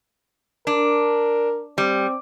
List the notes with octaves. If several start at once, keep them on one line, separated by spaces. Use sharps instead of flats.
D4 A#4
G3 C4